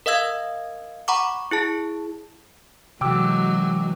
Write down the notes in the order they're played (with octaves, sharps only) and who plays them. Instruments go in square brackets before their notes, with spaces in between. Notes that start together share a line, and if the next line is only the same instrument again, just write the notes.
[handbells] A#4 D#5 F5 E6 G#6
F#5 A#5 B5 C#6 D6
E4 G#4 A5
[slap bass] C3 E3 [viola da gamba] F#3 G#3 F#4 [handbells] G5 D6 E6